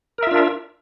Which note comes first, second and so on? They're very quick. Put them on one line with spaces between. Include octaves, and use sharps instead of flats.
A#4 E5 F4 D4